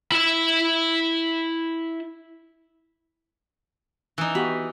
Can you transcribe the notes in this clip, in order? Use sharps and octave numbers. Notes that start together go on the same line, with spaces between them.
E4 E5
E3 D#4
B3 F#4 G4 B5